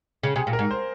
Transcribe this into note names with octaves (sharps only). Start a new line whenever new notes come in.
C#3
C3 G#4
A#2
A#4
G#2
C5